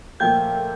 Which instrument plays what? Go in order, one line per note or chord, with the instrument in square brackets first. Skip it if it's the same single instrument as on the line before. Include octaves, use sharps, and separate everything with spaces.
[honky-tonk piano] A#2 F3 A3 [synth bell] G5 G6